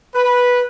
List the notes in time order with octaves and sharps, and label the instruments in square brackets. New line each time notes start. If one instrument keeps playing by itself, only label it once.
[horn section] B4